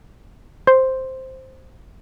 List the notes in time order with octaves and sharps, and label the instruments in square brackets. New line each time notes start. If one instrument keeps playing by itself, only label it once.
[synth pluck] C5